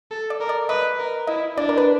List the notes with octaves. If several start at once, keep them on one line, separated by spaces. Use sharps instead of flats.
A4
D5
A#4
D5
B4 D#5
A#4
E4 D#5
D4 D5
A#4
B4